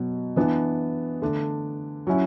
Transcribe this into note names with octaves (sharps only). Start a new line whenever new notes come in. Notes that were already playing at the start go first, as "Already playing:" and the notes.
Already playing: B2 F#3
E3 B3 D4
D3 A3 D4
F#3 C#4 E4